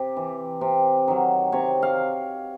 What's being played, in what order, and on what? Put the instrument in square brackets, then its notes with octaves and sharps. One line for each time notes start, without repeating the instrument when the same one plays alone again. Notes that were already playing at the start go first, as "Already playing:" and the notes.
Already playing: [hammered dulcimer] C3 G4
E3
C3
D#3 F#3
C3 C#5
F5